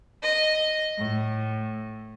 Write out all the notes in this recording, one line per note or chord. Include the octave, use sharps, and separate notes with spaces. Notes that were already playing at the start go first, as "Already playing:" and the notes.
D#5
A2